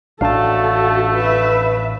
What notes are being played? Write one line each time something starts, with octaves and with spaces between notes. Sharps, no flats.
A1 A3 D4 F#4 A4 F5 A5
B4 E5